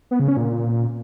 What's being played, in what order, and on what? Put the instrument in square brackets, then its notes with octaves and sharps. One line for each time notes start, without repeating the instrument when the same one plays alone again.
[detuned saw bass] B3
C#3
C#4
A#2